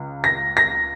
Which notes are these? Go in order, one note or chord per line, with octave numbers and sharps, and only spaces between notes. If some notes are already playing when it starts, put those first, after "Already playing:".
Already playing: C#2
A#6
A#6